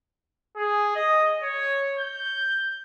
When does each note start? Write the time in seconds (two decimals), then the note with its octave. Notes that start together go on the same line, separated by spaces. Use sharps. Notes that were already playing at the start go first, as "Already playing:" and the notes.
0.57 G#4
0.95 D#5
1.42 C#5
1.99 G6